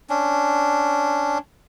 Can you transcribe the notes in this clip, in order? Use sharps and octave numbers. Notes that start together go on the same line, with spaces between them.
C#4 D4